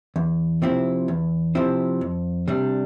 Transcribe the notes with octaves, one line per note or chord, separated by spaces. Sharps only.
E2
C3 F3 C4 E4
E2
C3 F3 C4 E4
F2
C3 G3 D4